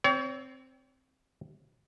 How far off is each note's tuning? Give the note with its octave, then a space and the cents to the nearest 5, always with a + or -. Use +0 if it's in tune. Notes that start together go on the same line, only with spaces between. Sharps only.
C4 +0 C#5 +40